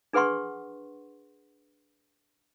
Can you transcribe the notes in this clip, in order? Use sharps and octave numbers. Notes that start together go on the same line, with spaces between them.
D4 G#4 B4 F#5 C6 C#6